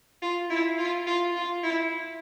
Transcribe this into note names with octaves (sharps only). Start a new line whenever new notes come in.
F4
E4
F4
F4
F4
E4